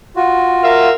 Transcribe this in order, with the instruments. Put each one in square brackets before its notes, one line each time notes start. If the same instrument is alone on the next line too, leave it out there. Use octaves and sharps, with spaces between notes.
[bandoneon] F4 F#4
[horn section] A#4 E5 F5